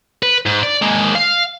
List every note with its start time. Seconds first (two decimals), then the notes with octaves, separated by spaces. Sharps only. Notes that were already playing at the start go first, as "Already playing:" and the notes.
0.23 B4
0.46 G#2
0.63 D5
0.82 G#3 A#3
1.15 F5